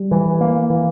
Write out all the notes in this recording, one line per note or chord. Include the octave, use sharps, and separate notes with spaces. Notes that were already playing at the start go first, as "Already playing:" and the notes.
Already playing: G3
E3
A#3
E3